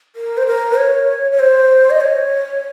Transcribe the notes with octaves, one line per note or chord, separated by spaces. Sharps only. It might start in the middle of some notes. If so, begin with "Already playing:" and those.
A#4
C5
A#4
C#5
C#5
C5
D#5
C#5